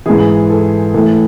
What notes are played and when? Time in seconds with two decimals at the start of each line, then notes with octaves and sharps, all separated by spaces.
0.06 G#2 E3 G#4
0.50 A4
0.94 A2 E3 A4